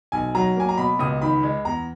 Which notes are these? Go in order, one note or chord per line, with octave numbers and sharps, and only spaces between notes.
B1 G#5
F#3 A#5
A#3 G#5
A#5
B2 B5
C#2 D#6
D#3 B5
G#3
E2 A#5